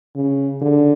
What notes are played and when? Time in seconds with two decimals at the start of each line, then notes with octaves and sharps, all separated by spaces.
0.16 C#3
0.62 D3